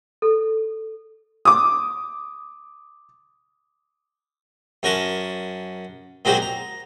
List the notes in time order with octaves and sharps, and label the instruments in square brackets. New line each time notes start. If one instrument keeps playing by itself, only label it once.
[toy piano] A4
[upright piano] D6 D#6
[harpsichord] F#2 C#4 A#4 F#5 A5 C6
A#2 F#3 G#3 C4 F#4 G4
A#5